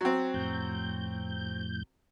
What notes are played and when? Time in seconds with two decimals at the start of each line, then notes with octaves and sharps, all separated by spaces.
0.01 F#3 C4
0.34 F2 A2 G6